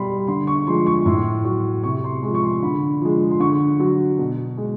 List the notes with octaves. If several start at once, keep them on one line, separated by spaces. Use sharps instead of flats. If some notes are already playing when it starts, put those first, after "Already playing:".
Already playing: B2 G3 B5 C6
D3 C6
C#6
F3 G#3 C6
C#6
A2 C6
F#3 C#6
C3 C#6
C6
F3 G#3 C6
C#6
C6
D3 B5
F3 G#3
C6
D3 C#6
F#3
B2
G#3